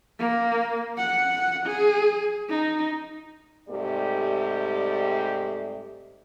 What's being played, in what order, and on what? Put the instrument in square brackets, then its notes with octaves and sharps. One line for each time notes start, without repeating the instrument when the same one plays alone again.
[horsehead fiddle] A#3
F#5
G#4
D#4
[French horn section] G#2 C3 G3 A3 G4 D5